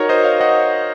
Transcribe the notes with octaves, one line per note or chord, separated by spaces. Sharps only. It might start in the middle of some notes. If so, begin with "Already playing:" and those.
Already playing: D#4 F#4 A#4 C#5
C5 D#5
C#5 F5
D#5 F#5